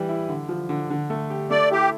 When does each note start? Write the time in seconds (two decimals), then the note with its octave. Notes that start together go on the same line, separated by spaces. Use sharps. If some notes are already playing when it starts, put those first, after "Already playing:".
Already playing: E3 G3
0.09 E4
0.29 D3
0.49 F3
0.69 D3
0.90 D3
1.10 A3
1.30 G4
1.51 A3 D5
1.71 E4 G4